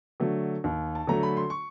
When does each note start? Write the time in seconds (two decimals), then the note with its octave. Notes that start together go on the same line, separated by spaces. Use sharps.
0.20 D3 F#3 A3
0.64 D#2
0.95 A5
1.07 D3 F#3 A3 A#5
1.23 B5
1.37 C6
1.50 C#6